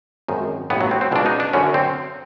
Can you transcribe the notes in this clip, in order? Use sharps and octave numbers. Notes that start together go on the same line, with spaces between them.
G#1 F#2 D#3
A1 G2 E3 B3
F#3
C4
C4
C#2 B2 F#3 D4
D#4
D4
F#2 D3 F#3 C#4
C4